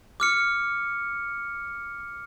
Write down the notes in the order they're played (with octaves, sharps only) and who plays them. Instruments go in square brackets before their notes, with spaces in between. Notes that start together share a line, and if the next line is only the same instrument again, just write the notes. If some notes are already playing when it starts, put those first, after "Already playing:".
[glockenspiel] D6 F6 C#7